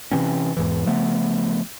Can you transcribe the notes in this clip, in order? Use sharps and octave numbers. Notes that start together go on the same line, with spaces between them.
C3 E3 C4 C#4
E2 G#2 E3
C#3 F3 A3 B3